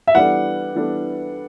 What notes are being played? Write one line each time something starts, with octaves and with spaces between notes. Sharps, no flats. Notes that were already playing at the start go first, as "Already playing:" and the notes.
E5
E3 G3 B3 D4 A4 F#5
E3 G3 B3 D4 A4